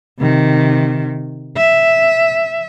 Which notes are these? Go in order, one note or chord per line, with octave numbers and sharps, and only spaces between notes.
C3 D#3
E5